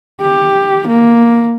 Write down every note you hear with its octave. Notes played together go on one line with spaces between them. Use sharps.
G4
A#3